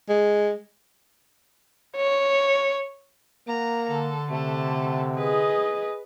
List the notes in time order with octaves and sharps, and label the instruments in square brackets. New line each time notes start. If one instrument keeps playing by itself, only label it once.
[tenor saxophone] G#3
[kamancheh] C#5
[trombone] A#3 [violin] F#5 A#5
[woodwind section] D3 [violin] A4
[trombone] C3 [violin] A3 A4
[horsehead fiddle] G#4 D#5 [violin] B4